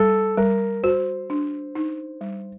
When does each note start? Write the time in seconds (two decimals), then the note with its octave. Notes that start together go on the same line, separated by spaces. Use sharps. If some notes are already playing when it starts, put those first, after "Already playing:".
Already playing: G3 A4
0.37 G3 A#4
0.83 F#4 C5
1.30 D4
1.75 D#4
2.21 G3